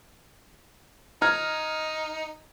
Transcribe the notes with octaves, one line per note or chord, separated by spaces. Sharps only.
D#4 A#5 F6 G#6